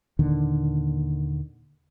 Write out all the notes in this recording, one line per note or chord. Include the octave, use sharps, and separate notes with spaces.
D#2 A#2 D3 D#3